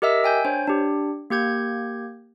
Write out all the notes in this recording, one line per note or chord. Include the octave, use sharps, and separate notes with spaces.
G4 A#4 D#5 E5 E6
G5 G#5 G6
D4 C5 C#5
D4 G4
A#3 G4 G6 G#6